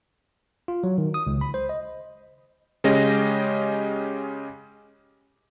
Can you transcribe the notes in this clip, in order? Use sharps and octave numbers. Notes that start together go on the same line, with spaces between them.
F4
F#3
D#3
D#6
C#2
B5
C5
D#5
C#3 G#3 C#4 G4 D#5 A#6